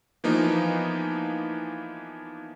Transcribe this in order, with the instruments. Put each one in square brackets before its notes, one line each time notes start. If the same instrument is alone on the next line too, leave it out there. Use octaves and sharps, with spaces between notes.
[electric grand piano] E3 F3 A#3 B3 D#4